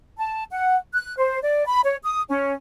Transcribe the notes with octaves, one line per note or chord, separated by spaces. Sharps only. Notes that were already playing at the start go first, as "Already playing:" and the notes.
A5
F#5
F#6
C5
D5
B5
C#5
D#6
C#4